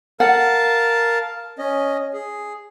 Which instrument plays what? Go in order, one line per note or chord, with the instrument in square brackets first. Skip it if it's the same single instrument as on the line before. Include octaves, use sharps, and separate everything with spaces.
[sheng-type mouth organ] A#4 F5 A5 [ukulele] F#5
[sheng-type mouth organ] C#4 D#5
G#4